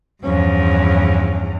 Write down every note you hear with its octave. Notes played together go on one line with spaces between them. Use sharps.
E2 G2 F3 C#4